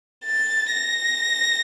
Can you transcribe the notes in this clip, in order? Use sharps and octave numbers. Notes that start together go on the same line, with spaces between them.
A6
A#6